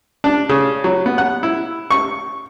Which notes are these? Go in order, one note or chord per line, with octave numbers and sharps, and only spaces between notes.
D4
C#3
F#3
B3
F#5
E4
C#6